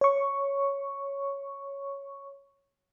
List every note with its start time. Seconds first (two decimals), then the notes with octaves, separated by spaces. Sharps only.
0.01 C#5 C#6